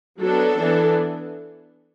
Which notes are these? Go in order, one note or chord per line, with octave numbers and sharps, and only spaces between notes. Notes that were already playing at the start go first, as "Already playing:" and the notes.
F#3 B3 D4 A4
E3 B3 D4